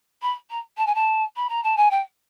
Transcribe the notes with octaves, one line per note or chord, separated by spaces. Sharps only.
B5
A#5
A5
G#5
A5
B5
A#5
A5
G#5
G5